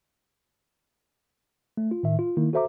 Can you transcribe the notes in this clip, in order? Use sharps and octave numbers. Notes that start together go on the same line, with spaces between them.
A3
F4
A2 D#3 E5
F4
D#3 A#3 E4
F#4 A4 C5 E5 A#5 D6